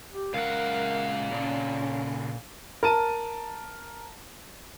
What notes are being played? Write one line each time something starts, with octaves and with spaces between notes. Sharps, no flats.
G4
C#2 A#2 A#4 F5 F#5
C#3 C#4 D4
A#4 A5 D#7